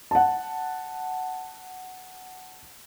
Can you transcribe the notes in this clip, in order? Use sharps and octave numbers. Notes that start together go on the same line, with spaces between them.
F#5 A5